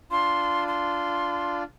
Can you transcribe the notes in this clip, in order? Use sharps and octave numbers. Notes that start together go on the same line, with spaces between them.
D4 F4 C6
C6